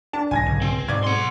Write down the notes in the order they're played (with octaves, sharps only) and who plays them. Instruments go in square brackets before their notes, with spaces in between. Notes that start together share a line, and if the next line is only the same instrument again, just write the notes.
[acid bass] D4 [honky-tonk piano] A5
[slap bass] B1 G#2 D3 [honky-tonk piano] G#5 G#6 A#6
[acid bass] C#2
[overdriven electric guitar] C4
[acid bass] G#2 [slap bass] B2 [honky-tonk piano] D5 G#6
[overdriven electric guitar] F#5 C6